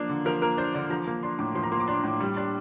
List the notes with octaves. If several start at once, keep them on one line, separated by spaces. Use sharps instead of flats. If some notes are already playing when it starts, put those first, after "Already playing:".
Already playing: F3 A#3 D4
D3
F3 A#4
A#3 A#4
D4 C5
D3 D5
F3 A#5
A#3
D4 C6
A2 D6
F3 C6
A#5
A#3 C6
D6
D4 C6
A2
G3
D4